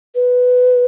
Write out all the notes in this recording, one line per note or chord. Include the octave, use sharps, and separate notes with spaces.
B4